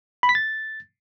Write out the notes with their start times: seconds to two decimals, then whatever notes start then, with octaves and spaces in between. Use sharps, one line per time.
0.23 B5
0.29 B6
0.35 A6